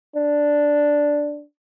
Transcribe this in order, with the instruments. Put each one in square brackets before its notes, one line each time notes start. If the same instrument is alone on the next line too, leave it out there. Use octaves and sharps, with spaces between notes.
[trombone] D4